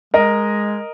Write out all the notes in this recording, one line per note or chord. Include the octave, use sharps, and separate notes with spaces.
G#3 A#4 D#5